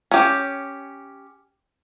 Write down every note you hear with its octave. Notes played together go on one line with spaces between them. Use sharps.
C#4 G4